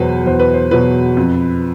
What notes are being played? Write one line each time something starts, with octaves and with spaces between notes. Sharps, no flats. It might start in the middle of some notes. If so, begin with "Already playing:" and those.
Already playing: E2 B2 F#3 B4 C5
E2 C5
B4
C5
B2 F#3 B4
F2